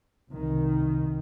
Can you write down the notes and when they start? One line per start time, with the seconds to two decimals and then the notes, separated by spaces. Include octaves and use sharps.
0.30 C2 D#3